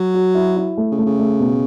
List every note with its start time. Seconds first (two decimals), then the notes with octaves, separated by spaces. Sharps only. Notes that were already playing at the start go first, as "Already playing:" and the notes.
Already playing: F#3
0.14 F#4
0.35 E4
0.56 E4
0.77 A3
0.91 C#3
0.98 A3
1.05 C#3
1.19 A3
1.40 B2